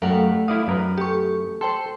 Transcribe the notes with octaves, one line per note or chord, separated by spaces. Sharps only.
F#2 G3 A3 A#4 F5 F#5
E4 D5 F5 D#6
F#2 A#4 B4
A3 G4 C#6
A4 C5 G5 C6